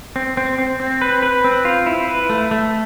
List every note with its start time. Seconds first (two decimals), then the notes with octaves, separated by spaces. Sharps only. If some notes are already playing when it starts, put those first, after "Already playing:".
0.16 C4
0.37 C4
0.58 C4
0.80 C4
1.01 B4
1.22 B4
1.44 C4
1.65 F4
1.86 E4
2.08 B4
2.30 A3
2.51 A3